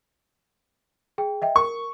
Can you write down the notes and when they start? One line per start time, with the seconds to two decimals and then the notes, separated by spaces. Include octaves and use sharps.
1.18 G#4 G5
1.42 D#5 E5 G5
1.56 A#4 C#6